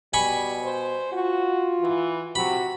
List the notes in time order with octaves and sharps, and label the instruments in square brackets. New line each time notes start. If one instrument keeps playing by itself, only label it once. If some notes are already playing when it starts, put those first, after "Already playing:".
[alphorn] B2 [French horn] G3 [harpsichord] G#5 B5 C#6
[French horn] C5
[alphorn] F4 [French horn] F#4
[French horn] E3
[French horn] C3 [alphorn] F#4 [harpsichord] B5